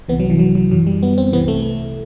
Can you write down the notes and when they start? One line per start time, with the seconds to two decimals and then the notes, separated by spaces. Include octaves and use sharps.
0.08 C2 C3 E3 B3
0.20 F#3
0.30 E3
0.39 F#3
0.55 F#3
0.71 F#2 E3 F#3
0.87 G3
1.03 B3
1.18 C4
1.33 C2 C3 E3 B3
1.48 A3